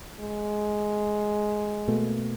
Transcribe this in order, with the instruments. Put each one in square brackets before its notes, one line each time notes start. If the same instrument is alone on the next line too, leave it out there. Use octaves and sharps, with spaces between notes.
[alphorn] G#3
[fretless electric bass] B2 A3 A#3